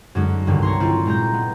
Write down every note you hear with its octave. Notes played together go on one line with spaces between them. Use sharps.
F#2 D3 G#3 C#4 D#4
C2 G2 D3 D#3
C#5 A#5 C6
C4 E4 F4
A#2 G#3 A#5 G6
B3